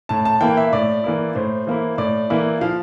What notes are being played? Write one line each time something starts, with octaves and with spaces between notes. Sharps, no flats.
A2 A5
A5
E3 A#3 E4 G5
E5
A2 D5
E3 A#3 E4
A2 C5
E3 A#3 E4
A2 D5
E3 A#3 E4
F3 F5